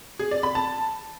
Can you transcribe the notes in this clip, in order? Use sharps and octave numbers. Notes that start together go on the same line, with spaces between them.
G#4
D5
B5
A5